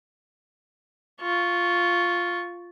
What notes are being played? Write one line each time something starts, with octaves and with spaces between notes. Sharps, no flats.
F4 C#6